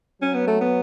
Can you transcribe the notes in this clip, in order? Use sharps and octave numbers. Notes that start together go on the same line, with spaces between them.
F#3 C#4
B3
A3
B3